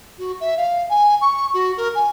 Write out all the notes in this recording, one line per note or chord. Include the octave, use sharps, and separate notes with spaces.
F#4
E5
F5
G#5
C#6
F#4
A#4
G#5